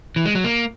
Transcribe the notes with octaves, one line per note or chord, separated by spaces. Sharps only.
E3
G#3
F#3
A#3